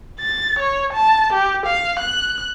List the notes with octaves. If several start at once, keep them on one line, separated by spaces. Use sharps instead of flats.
A6
C#5
A5
G4
F5
F#6